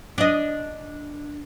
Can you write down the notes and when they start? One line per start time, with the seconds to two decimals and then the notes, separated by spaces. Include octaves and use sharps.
0.18 D4 D#5